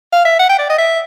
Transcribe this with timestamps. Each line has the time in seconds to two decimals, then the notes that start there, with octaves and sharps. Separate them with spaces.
0.12 F5
0.25 E5
0.39 F#5
0.49 G5
0.58 D5
0.69 D#5
0.78 E5